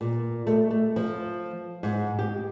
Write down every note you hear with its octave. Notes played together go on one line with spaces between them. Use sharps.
A#2
A3
A3
F3
G#2
G4